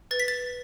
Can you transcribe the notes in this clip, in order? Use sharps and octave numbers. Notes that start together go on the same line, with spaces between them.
B4 A6
B6
A6